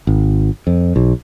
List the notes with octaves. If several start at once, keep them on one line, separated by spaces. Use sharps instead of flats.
G#1
F2
B1